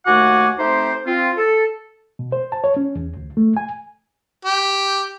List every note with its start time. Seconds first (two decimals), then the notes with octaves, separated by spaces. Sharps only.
0.06 D#2 A3 F#4 F#5 G#5 D6
0.58 A3 C4 D#4 G4 C5
1.06 C4 F4
1.36 A4
2.19 B2
2.32 C5
2.52 A5
2.64 C#5
2.77 C#4
2.96 E2
3.17 D2
3.37 A3
3.57 G#5
4.45 G4